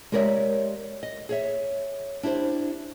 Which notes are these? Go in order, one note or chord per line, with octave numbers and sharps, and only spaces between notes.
G#3 G4 A#4 C#5 D5 E5
D#5
G#4 C#5 E5
D4 E4 G4 C5